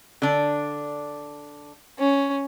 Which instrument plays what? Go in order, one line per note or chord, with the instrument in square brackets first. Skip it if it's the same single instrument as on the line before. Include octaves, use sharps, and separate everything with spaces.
[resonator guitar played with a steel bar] D3 D4
[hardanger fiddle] C#4